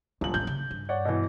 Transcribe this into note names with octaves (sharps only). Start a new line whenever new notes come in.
D#1 D2 F3 F#7
A1 G6
C#3
G2
C#5 D5 F#5
B2 E3